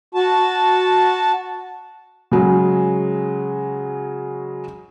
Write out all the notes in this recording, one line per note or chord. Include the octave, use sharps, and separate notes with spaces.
F#4 A5
C#3 F#3 G#3